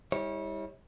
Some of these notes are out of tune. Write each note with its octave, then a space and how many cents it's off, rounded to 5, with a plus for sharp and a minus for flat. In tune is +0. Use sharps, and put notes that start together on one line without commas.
G3 +30 E4 -35 C#5 -20